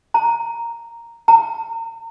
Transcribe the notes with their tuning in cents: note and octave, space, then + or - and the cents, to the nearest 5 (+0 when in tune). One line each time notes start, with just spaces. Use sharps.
A#5 -5
A#5 -40